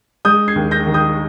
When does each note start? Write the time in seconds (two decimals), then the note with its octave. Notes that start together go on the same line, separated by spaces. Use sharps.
0.25 G#3 D#6 G6
0.48 G#6 C7
0.56 D#2
0.71 G6 A#6
0.86 D#3
0.94 D#6 G6